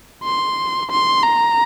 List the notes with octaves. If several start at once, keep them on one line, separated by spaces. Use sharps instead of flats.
C6
C6
A#5